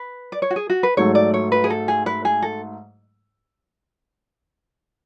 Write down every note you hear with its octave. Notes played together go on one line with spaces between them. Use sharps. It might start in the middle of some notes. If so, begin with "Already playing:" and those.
Already playing: B4
D5
C#5
F#4
G#4
F#4
B4
G#2 F#3 A3 C#5
D5
C#5
B4
G#4
A4
G#4
B4
G#4
A4